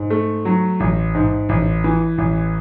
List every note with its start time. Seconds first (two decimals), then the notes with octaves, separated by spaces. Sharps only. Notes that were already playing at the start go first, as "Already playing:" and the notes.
Already playing: G#2
0.10 A3
0.45 F#3
0.80 A1
1.15 G#2
1.49 A1
1.84 E3
2.18 A1